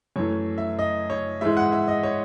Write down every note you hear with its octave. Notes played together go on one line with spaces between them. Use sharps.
F#2 E3 A3 C#5
E5
D#5
C#5
G#2 E3 G#3 E5
F#5
E5
D#5
C#5